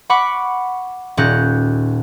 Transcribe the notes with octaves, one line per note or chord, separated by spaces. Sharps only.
F#5 B5 C#6 D6
D#1 A#2 C#4 F#6 G6 A#6